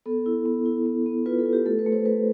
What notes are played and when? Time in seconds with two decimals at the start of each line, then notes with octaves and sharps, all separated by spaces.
0.06 B3 A4
0.26 E4
0.46 B3
0.66 E4
0.86 B3
1.06 B3
1.26 F4 B4
1.39 A4
1.46 F4
1.53 G4
1.66 A3 A4
1.79 B4
1.86 A3
1.92 C5
2.05 A3 B4